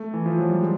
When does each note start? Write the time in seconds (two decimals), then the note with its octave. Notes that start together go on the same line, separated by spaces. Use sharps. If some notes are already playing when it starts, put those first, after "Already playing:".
Already playing: A3
0.14 E3
0.26 F3
0.38 F#3
0.50 G3
0.62 G#3